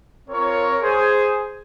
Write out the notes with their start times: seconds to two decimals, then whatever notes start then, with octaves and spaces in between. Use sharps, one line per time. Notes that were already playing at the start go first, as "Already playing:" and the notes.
0.29 C4 F4 A#4 C#5
0.82 G#4 C5